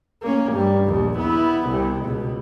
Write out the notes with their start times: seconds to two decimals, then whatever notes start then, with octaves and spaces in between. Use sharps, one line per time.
0.22 A#3 C#4
0.52 G2 G3
0.85 A#1 D#2
1.18 B3 E4
1.69 C2 C3
2.05 C#2 B2